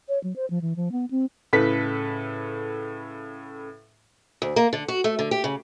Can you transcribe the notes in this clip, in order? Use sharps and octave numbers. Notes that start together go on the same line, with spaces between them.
C#5
F#3
C5
F3
E3
F3
B3
C4
A2 C#3 A4 B4 B6
D2
A#3
D3
F#4
A3
D3
G4
C#3